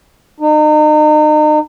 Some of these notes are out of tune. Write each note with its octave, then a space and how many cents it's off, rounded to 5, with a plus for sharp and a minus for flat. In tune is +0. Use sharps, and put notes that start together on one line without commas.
D#4 -35